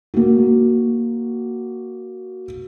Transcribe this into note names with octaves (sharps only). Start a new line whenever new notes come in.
A#3 F#4